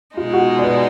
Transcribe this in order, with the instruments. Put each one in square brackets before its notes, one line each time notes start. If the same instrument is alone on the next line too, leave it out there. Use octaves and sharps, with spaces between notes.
[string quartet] B2 G#3 D#4 [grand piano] F4
[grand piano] F#4
D5
B4